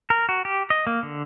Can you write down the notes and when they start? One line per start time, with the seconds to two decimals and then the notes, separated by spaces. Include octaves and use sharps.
0.10 A#4
0.29 F#4
0.45 G4
0.70 D#5
0.87 A#3
1.03 D3